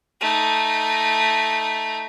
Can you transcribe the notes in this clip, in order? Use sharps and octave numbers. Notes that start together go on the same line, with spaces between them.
A3 D#4